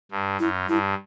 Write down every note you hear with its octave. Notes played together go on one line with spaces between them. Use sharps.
G2
F#2 E4
G2 E4